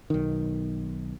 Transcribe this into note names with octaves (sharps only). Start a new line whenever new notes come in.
B1 D#3